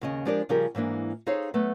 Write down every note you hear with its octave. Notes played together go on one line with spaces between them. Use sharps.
D#2 C#3 D#5
F3 G#3 D4 G4 A#4 D5
C#3 F3 G3 G4 G#4 A#4
G#2 E3 A#3 D4
D#4 G#4 A4 C5 C#5 F5
F#3 A3 B3